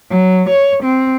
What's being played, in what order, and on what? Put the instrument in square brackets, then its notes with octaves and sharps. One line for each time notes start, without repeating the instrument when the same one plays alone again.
[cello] F#3
C#5
C4